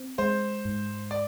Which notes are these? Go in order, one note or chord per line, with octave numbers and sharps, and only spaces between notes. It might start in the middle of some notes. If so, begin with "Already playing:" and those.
Already playing: C4
G#3 C5
G#2
D5